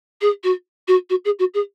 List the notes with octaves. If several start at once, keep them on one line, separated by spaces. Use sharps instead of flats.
G#4
F#4
F#4
F#4
G#4
F#4
G#4